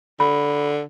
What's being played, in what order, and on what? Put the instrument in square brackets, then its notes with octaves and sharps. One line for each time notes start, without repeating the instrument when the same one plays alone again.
[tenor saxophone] D3 [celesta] B5